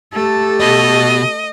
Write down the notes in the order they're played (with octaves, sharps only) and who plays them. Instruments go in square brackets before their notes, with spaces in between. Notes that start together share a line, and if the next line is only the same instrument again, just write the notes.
[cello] A3 A4 [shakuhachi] G4
[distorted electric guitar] B2 [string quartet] D#5